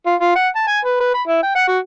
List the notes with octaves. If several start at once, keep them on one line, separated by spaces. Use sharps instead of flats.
F4
F4
F#5
A5
G#5
B4
B4
B5
E4
G5
F#5
F#4